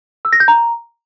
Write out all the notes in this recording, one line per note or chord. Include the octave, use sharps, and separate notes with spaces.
E6
A#6
G6
A#5